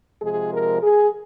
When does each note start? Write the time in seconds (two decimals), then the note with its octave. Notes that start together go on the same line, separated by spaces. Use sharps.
0.22 C3 F3 G#3 G#4
0.52 A#4
0.82 G#4